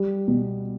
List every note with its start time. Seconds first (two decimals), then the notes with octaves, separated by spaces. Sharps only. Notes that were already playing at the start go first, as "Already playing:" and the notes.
Already playing: G3
0.28 B2